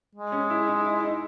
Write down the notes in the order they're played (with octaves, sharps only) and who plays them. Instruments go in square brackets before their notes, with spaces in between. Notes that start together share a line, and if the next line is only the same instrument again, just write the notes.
[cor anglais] G#3
[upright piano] C#4
E4
D#4
E4
E4
D#4